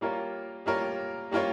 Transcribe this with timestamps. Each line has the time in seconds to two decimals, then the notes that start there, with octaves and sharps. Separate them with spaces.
0.01 G3 A#3 F4 A#4 C#5
0.66 G3 A#3 F4 A#4 C#5
1.31 G3 A#3 F4 A#4 C#5